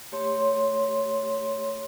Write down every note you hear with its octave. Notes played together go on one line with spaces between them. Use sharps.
A3 G4 C#5 C6